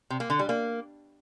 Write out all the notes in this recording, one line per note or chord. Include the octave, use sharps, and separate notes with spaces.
C3
A#3
D3
G3
A#3